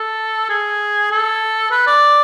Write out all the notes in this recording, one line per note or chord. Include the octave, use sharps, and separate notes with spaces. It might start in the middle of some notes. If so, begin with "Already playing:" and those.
Already playing: A4
G#4
A4
B4
D5